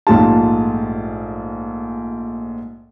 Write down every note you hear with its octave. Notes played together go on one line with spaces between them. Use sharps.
A#1 G#2 A3 F4 G4 A5